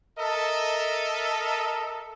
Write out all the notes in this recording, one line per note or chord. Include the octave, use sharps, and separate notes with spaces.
A4 A#4 D#5 E5 A5